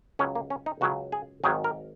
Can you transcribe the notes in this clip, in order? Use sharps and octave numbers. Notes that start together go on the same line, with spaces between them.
C#2 C#3 F#3 C#4
A#3
C#4
D#4
C#2 C#3 F#3 F#4
G#4
G#1 G#2 D#3 F#3 G#4
A#4